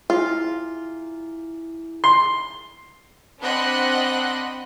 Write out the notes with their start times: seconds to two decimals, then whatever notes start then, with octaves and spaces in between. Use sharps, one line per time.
0.10 E4 F4 G#4
2.04 C6
3.42 C4 D4 D#5 F#5 B5 F#6